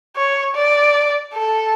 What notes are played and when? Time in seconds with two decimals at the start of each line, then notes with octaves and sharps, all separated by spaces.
0.16 C#5
0.55 D5
1.34 A4